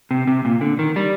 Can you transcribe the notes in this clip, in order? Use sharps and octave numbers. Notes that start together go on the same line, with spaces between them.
C3
C3
A#2
D3
D#3
G3